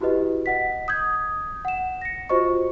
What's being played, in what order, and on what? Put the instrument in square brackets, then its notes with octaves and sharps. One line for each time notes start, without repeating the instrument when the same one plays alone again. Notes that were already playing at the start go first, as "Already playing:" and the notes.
[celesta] E4 F#4 G4 B4 D#5
D#5 F#5 B6
D#6 G6 G#6
F#5 E7
A#6 C#7
F4 F#4 C5 D#5 C#6